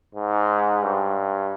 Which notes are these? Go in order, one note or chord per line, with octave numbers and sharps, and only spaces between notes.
G#2
G2